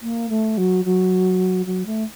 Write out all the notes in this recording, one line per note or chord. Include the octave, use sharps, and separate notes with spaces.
A#3
A3
F#3
F#3
F#3
A3